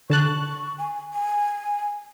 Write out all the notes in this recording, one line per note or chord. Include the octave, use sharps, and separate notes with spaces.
D3 A5 C#6 F#6
G#5
G#5